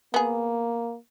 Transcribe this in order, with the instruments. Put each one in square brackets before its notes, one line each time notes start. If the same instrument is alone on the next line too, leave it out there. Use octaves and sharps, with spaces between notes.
[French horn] A#3 [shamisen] B3 G#4